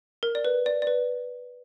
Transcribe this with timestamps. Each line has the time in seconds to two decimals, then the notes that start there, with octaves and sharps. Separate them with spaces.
0.23 A#4
0.35 D5
0.45 B4
0.66 D5
0.82 D5
0.87 B4